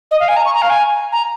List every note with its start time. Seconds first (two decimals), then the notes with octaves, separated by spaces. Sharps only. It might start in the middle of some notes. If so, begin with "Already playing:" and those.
0.11 D#5
0.20 F5
0.28 G#5
0.36 A#5
0.45 C#6
0.54 A#5
0.62 F5
0.70 G#5
1.12 A#5